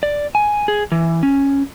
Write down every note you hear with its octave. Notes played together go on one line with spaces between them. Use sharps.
D5
G#5
G#4
E3
C#4